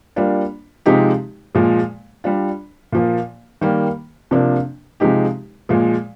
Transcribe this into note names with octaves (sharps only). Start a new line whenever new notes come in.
G3 A#3 D4 F4
C3 F3 G#3 D#4 G4
A#2 F3 G#3
G3 D4 F4
A#2 F3 A#3
D#3 G3 A#3
C3 F3 A#3 D4
C3 F3 G#3 D#4 G4
A#2 F3 G#3